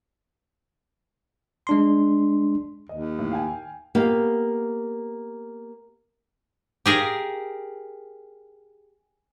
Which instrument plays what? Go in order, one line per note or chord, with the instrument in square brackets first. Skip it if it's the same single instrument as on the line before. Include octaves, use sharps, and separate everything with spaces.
[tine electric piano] G#3 D4 C6
[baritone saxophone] D#2 [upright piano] D#5
[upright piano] A2
F5 G5 G#5
[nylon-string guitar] A#3 B3 G4 F5
[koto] G4 G#4 A#4 F5